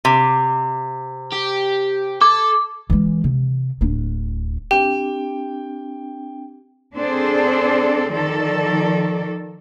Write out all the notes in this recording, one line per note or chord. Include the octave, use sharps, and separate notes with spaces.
C3
G4
A4 D6
E3 G#3
C3
D1 D4
C4 D4 G4 G5
C4 D4 G#4 A4 C5 D5
D#3 F3 A4 D5